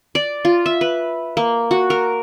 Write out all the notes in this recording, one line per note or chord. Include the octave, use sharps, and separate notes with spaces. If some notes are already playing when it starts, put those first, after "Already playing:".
D5
F4
E5
B4
A#3
F#4
A#4